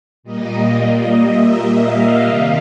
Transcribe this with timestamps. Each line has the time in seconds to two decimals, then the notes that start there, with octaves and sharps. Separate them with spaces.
0.23 A#2 G3 A#3 D#5
1.24 E5
1.76 F5
2.26 C3 D#3 G3